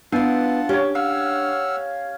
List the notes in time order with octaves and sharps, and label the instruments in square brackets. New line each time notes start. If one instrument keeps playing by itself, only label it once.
[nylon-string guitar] B3 E4 [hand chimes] D4 [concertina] F4 F#5 A5
[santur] C#4 C#5 [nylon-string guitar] G4
[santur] F5 [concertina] F#5 E6 F6